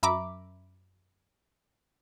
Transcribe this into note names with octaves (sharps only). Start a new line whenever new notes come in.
F#2 E5 A#5 B5 D6